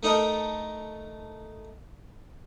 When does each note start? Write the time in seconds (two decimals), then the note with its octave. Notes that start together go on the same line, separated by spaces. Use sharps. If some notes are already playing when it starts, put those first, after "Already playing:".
0.03 A3 D#4 A4 A#4